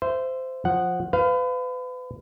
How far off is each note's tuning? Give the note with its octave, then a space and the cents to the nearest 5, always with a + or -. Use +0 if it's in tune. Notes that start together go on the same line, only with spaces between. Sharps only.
C5 -15 E5 +20
F3 +15 F#5 +0
B4 +35 F5 +0